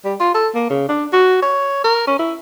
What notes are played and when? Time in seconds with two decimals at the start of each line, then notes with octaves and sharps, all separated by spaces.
0.05 G3
0.20 F4
0.34 A4
0.55 A#3
0.70 C#3
0.89 D4
1.13 F#4
1.42 C#5
1.84 A#4
2.07 C#4
2.19 E4